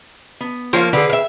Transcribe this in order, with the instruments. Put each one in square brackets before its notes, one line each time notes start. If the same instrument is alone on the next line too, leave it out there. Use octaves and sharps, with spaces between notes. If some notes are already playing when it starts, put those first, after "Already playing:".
[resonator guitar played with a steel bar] B3
[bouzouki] F3 A#3 C#5 [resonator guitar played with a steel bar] F4 F5
[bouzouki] D3 [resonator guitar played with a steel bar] G#4 B4
[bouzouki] E5 F5